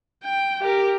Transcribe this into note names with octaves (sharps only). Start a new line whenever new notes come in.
G5
G4 A#4